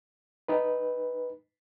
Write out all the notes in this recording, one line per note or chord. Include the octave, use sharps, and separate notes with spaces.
D#4 B4